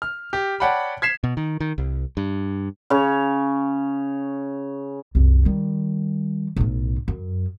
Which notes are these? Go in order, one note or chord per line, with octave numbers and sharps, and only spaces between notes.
F6
G4
C#5 D5 F#5 G5 A5 B5
G#6 B6 C7 E7
B2
D#3
D#3
C2
G2
C#3 C#5
C2 F#2
D#3 G3
B1 A2
F#2